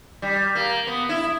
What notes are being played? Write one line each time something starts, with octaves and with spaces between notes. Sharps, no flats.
G3
A#3
B3
E4